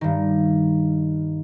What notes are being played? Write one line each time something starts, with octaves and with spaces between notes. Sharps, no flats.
G2 D#3